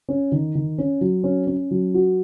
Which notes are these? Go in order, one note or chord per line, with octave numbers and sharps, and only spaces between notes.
C#4
D#3
D#3
C#4
F#3
C#4
C#4
F#3
F#4